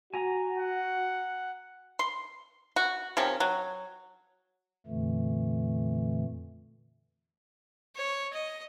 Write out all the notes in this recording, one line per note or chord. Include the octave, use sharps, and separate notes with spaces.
F#4 G#5 A#5
F#5
C6
F#4
C3 D#3 F3 C#4
F#3
F2 A#2 D3 E3 A3
C#5
D#5